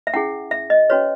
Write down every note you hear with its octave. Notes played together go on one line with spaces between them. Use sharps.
E5
C#4 E4 G#4 F#5
E5
D#5
C#4 F#4 B4 C#5